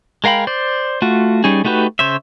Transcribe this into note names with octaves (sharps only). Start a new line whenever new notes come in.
G#3 A#4 F5 G5 B5
C5 D5
A3 F4 F#4
G3 C#4 D#4 G#4
A3 D#4 F#4 G4 B4
C#3 C5 C#5 E5